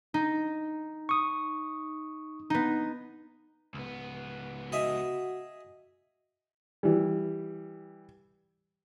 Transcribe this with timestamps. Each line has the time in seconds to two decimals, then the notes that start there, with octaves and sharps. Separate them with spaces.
0.14 D#4
1.09 C#6 D#6
2.50 B3 D#4
3.74 C#2 B3
4.72 F#4 G#4 D#5 E5
6.83 E3 G3